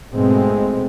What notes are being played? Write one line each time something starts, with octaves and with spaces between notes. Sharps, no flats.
G#2 B2 G#3 A3 C4